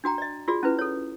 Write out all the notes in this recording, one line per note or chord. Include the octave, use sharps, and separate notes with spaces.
D4 F#4 G5 A#5
D5 D#5
F4 F#4 G#4 D5
C#4 E4 B4
A4 C#5